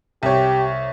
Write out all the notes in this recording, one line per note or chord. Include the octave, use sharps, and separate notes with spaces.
C2 G4 C#5